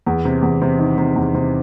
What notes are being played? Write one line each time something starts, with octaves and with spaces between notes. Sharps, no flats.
E2
C3
E2
C3
D#3
C3
E2
C3